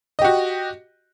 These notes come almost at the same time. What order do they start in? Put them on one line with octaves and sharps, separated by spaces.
D#5 G4 F#4